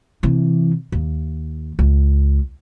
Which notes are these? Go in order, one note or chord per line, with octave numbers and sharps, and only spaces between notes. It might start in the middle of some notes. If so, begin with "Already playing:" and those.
C3 E3
D#2
C#2